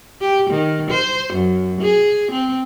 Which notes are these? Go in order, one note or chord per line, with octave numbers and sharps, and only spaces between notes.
G4
D#3
C5
F#2
G#4
C4